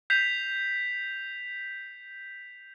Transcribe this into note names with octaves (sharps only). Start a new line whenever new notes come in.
G6 B6 C7 F7